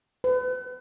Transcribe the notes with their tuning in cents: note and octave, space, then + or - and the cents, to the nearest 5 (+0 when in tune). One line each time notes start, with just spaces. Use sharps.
B4 +35